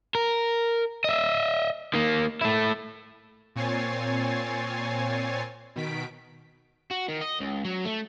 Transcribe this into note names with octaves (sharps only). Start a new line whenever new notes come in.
A#4
D#5 E5
D#3 A#3
A3 E4
A#2 C4 C#5 G#5 A6 C7
B2 D#3 B6 D7
F#4
D#3
D#5
C#2
F#3
A3